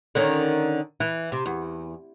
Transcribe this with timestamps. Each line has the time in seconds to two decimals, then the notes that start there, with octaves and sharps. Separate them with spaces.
0.15 D3 D#3 C#4
1.00 E3
1.32 C3
1.46 E2